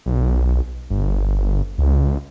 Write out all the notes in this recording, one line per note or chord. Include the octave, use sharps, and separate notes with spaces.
B1
G1
C#2